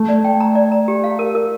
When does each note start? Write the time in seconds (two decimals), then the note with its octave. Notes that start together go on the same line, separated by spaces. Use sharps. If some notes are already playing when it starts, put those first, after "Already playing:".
Already playing: A3
0.09 D5
0.24 G5
0.40 A#5
0.55 D5
0.72 A#5
0.88 G4
1.04 F5
1.19 A#4
1.35 A#4